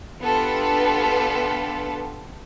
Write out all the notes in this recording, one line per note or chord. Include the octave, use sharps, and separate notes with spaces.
B3 D4 F4 G4 A4 B4